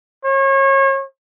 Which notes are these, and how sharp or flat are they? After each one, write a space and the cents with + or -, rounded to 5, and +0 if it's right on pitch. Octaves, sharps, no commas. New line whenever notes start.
C#5 -35